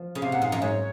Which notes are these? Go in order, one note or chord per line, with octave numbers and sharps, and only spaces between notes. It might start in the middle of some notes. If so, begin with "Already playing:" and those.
Already playing: F3
C#3
C3 F5
A#2 F#5
G#2 F5
F#2
G#2 C#5